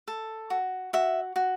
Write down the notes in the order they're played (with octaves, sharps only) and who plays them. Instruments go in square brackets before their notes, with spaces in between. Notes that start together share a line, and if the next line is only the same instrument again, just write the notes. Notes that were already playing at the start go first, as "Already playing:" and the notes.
[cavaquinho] A4
F#4
F#4 E5
F#4